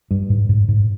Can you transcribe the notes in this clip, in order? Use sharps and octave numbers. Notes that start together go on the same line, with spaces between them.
G2
G#2
G#2
G#2